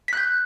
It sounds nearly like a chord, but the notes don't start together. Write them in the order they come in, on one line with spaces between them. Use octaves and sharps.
B6 F#6 G6